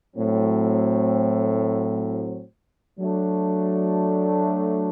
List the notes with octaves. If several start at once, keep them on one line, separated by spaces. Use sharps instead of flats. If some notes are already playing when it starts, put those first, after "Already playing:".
A2 F#3 C4
F#3 A3 D4